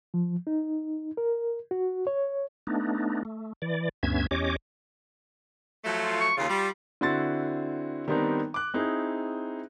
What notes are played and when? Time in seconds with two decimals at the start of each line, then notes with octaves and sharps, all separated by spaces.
0.14 F3
0.47 D#4
1.17 A#4
1.71 F#4
2.07 C#5
2.67 A3 B3 D4 D#4
3.25 A3
3.62 E3 D5
4.03 D2 G2 B3 C#4 E5 G#6
4.31 E2 C#4 G4 C#5 D#5 D6
5.84 F3 F#3 A3
6.04 F4
6.20 C#6
6.37 D#2 C#3 F4
6.49 G3
7.01 D3 C4 E4 F#4 C6 A6
8.08 D#3 G3 B3 C4 D4 D#4
8.54 D6 F#6
8.74 C4 D#4 E4 G#4